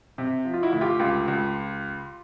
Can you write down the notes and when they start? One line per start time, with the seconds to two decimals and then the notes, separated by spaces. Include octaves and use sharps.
0.18 C3
0.45 F3
0.54 F4
0.63 E4 F#4
0.72 D2
0.81 F4 G4
0.99 C#2 F4 G4
1.28 C#2